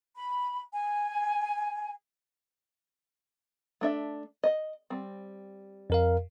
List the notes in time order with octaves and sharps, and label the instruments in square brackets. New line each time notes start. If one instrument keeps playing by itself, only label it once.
[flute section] B5
G#5
[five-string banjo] A3 D4 E5
D#5
G3 C4
[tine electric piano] F2 A#4 F5